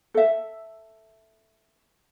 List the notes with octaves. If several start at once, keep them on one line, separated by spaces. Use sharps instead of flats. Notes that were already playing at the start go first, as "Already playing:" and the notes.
A4 E5